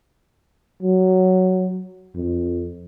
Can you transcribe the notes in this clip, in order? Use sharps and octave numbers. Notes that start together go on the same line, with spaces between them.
F#3
F2